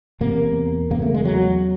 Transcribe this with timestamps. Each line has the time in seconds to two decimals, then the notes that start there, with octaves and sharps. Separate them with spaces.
0.21 E2 C3 A#3
0.91 E2 C#3 A#3
1.02 A3
1.14 G#3
1.25 F#3